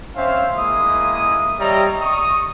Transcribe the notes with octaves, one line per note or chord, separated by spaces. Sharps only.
C4 C#4 C5 E5 F5
G#3 A#3 E4 D#6
G3 C#5 D#5 E5 G5 A#5
C#6 D#6